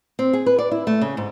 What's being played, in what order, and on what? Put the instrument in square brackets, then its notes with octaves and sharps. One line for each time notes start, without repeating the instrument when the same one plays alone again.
[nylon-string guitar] C4
G#4
B4
D5
E4
A3
C#3
G#2